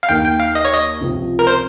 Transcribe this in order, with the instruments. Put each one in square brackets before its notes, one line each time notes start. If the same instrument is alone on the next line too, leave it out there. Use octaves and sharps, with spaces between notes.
[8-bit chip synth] F5
[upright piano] D#2 D#3 A#3 D#4 [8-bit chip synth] G5
[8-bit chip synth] G5
F5
D#5
C#5
D#5
[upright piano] C#2 C3 F3 C4
[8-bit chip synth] A#4
C5